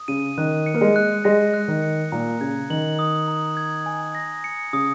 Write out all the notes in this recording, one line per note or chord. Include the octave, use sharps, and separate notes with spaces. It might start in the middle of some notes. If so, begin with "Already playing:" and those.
Already playing: D#6
C#3 D#7
D#3 F#6
C#7
A#3
G#3
F#6
G#3 A#6
F#6
D#3
C#7
A#2 A#5
C#3 G#6
D#3 F#7
D#6
A#5
G#6
G#5
A#6
C#7
C#3 D#6